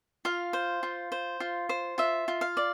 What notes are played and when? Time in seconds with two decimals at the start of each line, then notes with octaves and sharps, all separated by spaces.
0.25 F4 F5
0.53 C5
0.83 F4
1.12 C5
1.40 F4
1.69 C5
1.98 F4 E5
2.28 F4
2.41 F5
2.57 D5